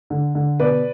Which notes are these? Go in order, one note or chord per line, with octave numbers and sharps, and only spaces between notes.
D3
D3
B2 B4 D5